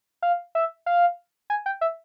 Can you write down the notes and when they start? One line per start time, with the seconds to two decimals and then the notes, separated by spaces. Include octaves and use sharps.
0.22 F5
0.55 E5
0.86 F5
1.50 G#5
1.66 G5
1.81 E5